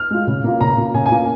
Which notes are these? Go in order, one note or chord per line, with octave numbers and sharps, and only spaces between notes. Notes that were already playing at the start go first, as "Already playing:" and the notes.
Already playing: F6
G#3 F4
C#3
A#3 F4
C#3 A#5
A#3 F4
C#3 G#5
G#5
A#3 F4